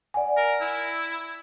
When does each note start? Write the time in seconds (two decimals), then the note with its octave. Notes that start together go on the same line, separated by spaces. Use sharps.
0.14 D5 F#5 G#5
0.37 A#4
0.61 E4